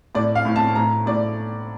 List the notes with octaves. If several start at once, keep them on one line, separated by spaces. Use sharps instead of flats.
A2 D5
F5
A2
A5
A2 A#5
A2 D5